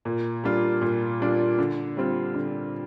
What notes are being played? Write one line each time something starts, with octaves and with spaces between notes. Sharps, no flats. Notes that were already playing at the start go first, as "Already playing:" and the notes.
A#2
G3 D4 F4
A#2
G3 D4 F4
D3
G3 C4 F4
D3